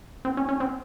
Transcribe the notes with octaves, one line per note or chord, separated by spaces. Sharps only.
C4
C#4
C#4
C4